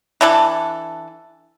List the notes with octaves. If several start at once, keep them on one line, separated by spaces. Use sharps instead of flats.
E3 D4 A4